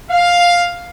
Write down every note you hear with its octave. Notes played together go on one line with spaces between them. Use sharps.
F5